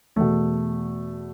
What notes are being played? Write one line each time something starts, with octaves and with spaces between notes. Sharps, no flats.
E2 B2 A3